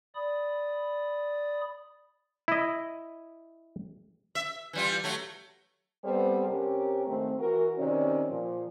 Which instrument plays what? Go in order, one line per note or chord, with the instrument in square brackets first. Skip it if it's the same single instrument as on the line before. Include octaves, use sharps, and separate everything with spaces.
[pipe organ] D5 B5 D#6
[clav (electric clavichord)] E4 D#5
[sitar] E5
E3 G3 F4
F#3 A3
[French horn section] G3 B3 C4 A4 B4 C5
C3 C#4 G4 A#4
G#2 D#3 A3 C4
E3 F#4 A#4
C3 D#3 C#4 D5
A#2 F3